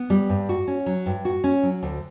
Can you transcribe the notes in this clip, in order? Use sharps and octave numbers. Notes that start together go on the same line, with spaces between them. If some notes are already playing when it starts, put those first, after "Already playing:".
Already playing: B3
G3
G2
F#4
C#4
F#3
G2
F#4
C#4
F#3
D2